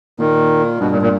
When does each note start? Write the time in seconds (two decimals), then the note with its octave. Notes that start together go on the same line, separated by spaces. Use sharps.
0.19 A#2 D#3
0.80 G2 B2
0.91 A#2
1.02 A#2